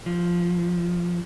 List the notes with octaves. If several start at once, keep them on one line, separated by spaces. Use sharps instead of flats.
F3